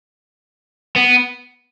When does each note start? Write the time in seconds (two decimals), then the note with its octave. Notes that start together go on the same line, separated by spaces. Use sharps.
0.96 B3